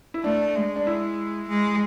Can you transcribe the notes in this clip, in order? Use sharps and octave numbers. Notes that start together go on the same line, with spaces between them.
E4
A3 D4
G#3
D4
E4
G#3